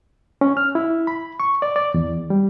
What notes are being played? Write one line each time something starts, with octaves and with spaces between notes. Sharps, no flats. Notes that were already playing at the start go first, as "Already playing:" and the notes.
C#4
F6
E4
B5
C#6
D5
D5
E2
G3